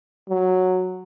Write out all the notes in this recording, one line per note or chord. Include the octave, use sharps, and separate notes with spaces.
F#3